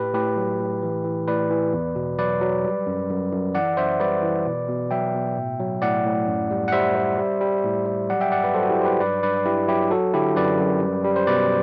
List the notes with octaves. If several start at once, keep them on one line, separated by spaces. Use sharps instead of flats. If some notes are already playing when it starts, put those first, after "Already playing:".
Already playing: A2 G4 B4
A2 G4 B4
F#3
A2
E3
E3
A2 B4 D5
E3
E2
B2
F#3 B4 D5
F#3
G3
F#2
F#2
F#2
E3 D5 F#5
F#2 C5 E5
G3 B4 D5
E3
B2
B2
F#3 E5 G5
B2
A2
F#3
A2 D5 F#5
A2
F#2
G3
F#5
G3 C5 E5
G3
G3
G3
A2
G3
F#3 D5 F#5
E5 G5
G2 D5 F#5
B4 D5
F#3 A4 C5
F#4
E4 G4
F#3 C5
G4 B4
G2 B4 D5
G2 B4 D5
G2 E4 G4
F#3 E4 G4
F#3 F#4 A4
D3 E4 G4
F#2 B4 D5
F#2
G3
G3
C5
B2 B4 D5